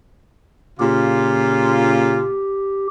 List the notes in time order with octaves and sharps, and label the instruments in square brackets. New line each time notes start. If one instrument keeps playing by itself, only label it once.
[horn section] A#2 C#3 F4 [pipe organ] G4